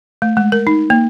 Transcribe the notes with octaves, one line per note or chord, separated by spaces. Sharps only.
A3
G#3
A#4
D#4
A#3